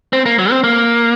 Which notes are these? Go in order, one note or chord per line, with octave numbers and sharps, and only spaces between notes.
C4
A#3
F#3
C4
A#3